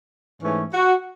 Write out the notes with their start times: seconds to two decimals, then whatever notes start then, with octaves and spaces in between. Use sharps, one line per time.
0.42 G#2 E3 A3 C#4
0.73 F#4